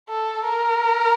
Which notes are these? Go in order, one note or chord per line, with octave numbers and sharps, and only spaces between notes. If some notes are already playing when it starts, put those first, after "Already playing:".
A4
A#4